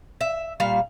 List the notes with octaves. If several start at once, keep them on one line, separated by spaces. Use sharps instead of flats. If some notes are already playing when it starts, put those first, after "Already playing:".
E5
A#2 G3 F5